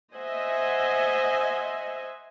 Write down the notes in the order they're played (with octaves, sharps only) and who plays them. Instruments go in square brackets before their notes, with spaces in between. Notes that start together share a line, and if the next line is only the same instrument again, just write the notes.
[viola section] C5 D#5 E5 F#5 G#5